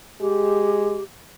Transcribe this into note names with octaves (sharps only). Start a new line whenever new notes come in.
G#3 G4